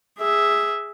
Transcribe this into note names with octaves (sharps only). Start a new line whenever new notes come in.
G#4 E5